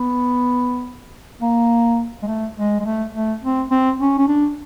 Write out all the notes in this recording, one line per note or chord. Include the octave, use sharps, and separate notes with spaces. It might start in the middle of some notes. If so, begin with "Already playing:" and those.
Already playing: B3
A#3
G#3
A3
G#3
G#3
A3
A3
C4
C4
C#4
C#4
D4